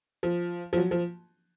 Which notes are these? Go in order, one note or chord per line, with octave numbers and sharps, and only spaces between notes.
F3
F3
F#3
F3